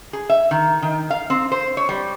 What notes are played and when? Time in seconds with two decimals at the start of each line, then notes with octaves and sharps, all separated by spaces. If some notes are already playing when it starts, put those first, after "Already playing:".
0.13 G#4
0.30 E5
0.51 D#3
0.82 D#3
1.10 F5
1.30 C4
1.52 C5
1.77 C#5
1.89 G3